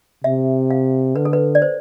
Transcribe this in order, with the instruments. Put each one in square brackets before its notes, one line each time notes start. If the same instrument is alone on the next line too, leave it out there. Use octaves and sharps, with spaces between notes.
[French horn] C3 [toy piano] E5
[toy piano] F5
[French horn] D3 [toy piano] B4
[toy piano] A4
B4
D5
C5